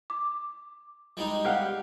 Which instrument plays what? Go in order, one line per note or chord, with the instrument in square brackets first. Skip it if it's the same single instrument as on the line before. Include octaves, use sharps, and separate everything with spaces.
[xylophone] D6
[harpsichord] G3 G#3 D#4
[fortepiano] G4 F5 F#5